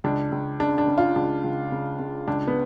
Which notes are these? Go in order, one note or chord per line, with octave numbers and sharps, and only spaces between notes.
C#2 D4
C#2
C#3 D4
D4
C#3
F4
C#2 D4
C#2
C#3
C#3
C#2 D4
B3